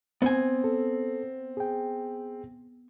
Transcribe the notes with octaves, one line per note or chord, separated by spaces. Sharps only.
B3 C4 G#5
A4
G#4 G5